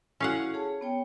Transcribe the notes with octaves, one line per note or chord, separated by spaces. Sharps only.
C#4 E4 F#4 A4 F5 F#5
G#4 C#5 A5
B3 C#5 G5